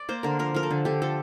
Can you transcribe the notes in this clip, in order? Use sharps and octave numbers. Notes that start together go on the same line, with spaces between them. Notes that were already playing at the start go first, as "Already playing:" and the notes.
Already playing: D5
A#3 C5
D3 A#4
F3 A#4
F3 A#4
A4
D3
D3 G4
F3 A4